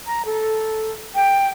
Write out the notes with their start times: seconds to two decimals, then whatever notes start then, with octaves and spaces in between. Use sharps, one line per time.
0.07 A#5
0.25 A4
1.15 G5